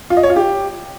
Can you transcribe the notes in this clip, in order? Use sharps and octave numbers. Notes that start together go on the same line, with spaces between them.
F4
D#5
C#5
F4
G4